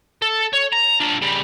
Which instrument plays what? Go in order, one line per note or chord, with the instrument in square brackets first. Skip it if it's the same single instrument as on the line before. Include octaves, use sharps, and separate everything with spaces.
[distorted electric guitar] A4
C#5
A#5
D4 F4
C#3 G3